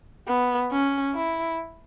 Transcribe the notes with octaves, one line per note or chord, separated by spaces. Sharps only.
B3
C#4
E4